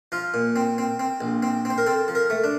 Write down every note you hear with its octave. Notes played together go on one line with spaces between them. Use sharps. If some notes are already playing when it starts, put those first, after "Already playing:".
F3 F4
A#2
C4
C4
C4
A#1
C4
C4
C5
A#4
C4 A4
F3
A#4
A3
D4